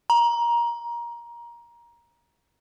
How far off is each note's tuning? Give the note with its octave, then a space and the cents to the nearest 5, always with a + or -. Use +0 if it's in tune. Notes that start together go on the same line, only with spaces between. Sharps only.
A#5 +20